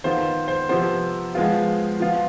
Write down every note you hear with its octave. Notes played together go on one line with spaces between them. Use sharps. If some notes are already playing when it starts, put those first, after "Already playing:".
D#3 B3 F4 C5
C5
C3 F3 B3 C5
F3 G#3 B3 F4
F3 B3 F4